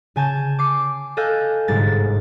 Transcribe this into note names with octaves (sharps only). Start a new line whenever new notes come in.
C#3 G#5 A5 G6
D6 C7
A4 D#5 F5 G#5 F#6 G6
G1 G#2 C3 G#3 A6